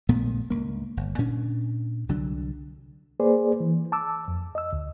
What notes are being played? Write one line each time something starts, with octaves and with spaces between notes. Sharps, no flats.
A#1 A#2 A3 B3
C#2 G2 A#3
G1
A#2 C#4 D4
C2 D3 F#3 D4
A#3 G#4 B4 C5 D5
E3
A5 D6 E6
F2
D#5 E6
D2